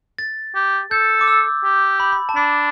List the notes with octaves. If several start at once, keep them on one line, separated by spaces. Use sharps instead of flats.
A6
G4
A4 G6
D6
E6
G4
B5
B5
A5
D4 B5